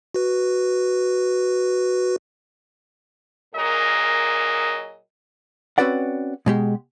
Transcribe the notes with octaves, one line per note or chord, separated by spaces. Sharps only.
F#4 B4
A#2 F#3 G#4 A#4 D#5
C4 C#4 F#4 B4 D5 F#5
B2 G#3 G4